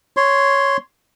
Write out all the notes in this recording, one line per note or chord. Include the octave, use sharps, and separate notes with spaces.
C#5 C6